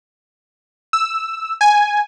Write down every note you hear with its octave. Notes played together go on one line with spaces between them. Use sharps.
E6
G#5